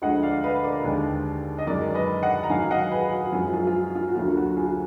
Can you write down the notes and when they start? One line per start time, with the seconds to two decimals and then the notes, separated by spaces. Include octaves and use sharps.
0.02 D2 D3 F3 G#3 D#5 F#5
0.23 D5 F5
0.44 B4 D#5
0.64 A#4 D5
0.84 D#2 D3 G#3
1.58 D#5
1.67 F#2 D#3 G#3 A#4 D5
1.94 B4 D#5
2.23 D#5 F#5
2.43 A#5
2.50 G#2 D#3 F#3 F5 G#5
2.71 D#5 F#5
2.91 G#4 B4
3.12 F#4
3.32 F#2 F3 G#3 F4 G#4
3.53 F4 G#4
3.67 F4
3.74 F#4
3.95 F4
4.08 F#4
4.15 D2 D3 F#3 A#3 F4
4.37 F#4
4.57 F4 G#4